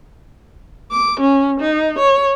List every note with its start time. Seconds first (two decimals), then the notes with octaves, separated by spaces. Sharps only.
0.91 D6
1.21 C#4
1.61 D#4
1.99 C#5